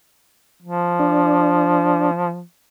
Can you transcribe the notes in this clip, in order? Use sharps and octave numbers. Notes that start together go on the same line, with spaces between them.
F3
D4